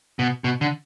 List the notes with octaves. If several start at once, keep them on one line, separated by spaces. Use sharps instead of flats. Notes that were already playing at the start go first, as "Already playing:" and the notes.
B2
B2
D3